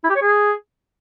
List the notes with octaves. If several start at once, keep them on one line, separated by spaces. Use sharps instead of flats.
E4
G4
C#5
G#4